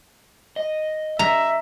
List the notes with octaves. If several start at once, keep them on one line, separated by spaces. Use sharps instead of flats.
D#5
E5 A#5